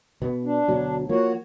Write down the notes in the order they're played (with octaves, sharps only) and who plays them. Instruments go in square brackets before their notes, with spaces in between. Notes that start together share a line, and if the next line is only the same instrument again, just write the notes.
[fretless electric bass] B2 B3
[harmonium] D4
[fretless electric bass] D2 B2 F#3
[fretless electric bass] F3 A#3 [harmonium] F#4 C#5